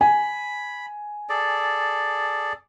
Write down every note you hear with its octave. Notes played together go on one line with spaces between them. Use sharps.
G#5 B5
G#4 A4 D5